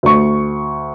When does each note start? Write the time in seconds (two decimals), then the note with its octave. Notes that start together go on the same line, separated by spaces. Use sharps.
0.03 D2 C#6